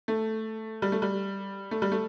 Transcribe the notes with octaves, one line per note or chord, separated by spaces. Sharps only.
A3
G3
A3
G3
A3
G3
A3